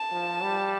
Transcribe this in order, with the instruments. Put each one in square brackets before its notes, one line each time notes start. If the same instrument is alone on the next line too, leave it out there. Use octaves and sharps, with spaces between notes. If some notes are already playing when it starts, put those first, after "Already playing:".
Already playing: [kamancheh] A5
[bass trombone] F3
G3